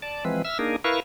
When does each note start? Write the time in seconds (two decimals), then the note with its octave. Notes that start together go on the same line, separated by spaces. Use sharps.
0.02 D5 A5
0.25 E3 F3 G#3 C4 B4
0.45 E5 E6 F6
0.59 A#3 D4 D#4 G#4 A#4
0.84 E4 A#4 B4 F5 C#6